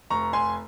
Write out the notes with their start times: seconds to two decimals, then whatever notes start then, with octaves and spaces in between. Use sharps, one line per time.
0.10 F1 A#5 C#6
0.33 G#5 C6